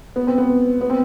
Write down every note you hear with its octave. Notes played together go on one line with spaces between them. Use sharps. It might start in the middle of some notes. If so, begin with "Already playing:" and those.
B3
C4
B3
B3
C4